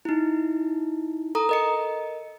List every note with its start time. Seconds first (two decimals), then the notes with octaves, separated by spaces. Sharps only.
0.05 D#4 E4
1.35 A4 A#5 D#6
1.49 A#4 D#5 C#7